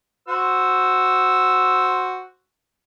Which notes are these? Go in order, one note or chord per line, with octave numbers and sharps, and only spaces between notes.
F#4 C5 E6